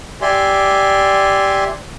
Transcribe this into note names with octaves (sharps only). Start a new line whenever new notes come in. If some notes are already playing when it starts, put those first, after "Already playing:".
G4 D5 E5 G#5 C6